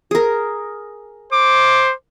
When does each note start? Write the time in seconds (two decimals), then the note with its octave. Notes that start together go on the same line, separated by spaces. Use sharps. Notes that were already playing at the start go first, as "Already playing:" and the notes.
0.11 G#4 A#4
1.33 C5 D6